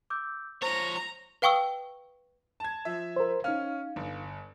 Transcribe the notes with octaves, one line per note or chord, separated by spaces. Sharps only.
D6 E6 G6
F3 C5 C#5 A#5
B4 F5 G5 C#6 D#6 E6
A5 G#6
F3 E5
A#4 C5
C#4 D#4 F5 F6
G1